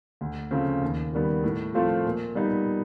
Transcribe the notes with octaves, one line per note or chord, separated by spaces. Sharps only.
D2
C#3 F3 A3 C4
D#2
D#3 G3 B3
A2
F3 A3 C4 F4
A#2
G3 B3 D#4